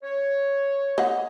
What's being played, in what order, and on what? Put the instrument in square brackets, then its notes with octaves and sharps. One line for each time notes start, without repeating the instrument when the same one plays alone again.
[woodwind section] C#5
[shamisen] D#5 F#5